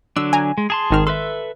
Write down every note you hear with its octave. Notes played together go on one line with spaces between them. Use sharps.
D3 F#3 D4 E6
G#5 A#5
G#3
G#4 A5 C6
G#1 D#3 F6
A4 B4 E5 C6